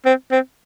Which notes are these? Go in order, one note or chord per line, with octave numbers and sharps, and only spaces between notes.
C4
C4